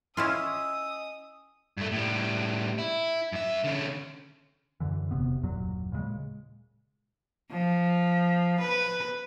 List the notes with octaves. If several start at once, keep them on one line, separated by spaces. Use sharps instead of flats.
C#4 E4 F4 D#5 G#5 D#6 E6
G2 A3
A2 G3
E4
F#2 E5
D3 C#4
F#2 D3 E3
E1 F#2 C3 B3
F#1 D#2 A#2 F#3
A#2 C#3 E3 G#3
F3
B4